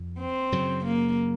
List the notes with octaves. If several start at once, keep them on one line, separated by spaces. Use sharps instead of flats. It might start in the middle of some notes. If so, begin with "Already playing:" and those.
Already playing: F2
C4
F#2 C#3 F#3
A#3